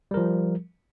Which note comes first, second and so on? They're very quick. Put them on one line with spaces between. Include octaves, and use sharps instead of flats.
G3 A#4 F3